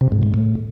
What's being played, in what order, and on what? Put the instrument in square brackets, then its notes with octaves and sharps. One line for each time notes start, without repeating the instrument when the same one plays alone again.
[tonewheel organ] C3
G#2
G#2
A2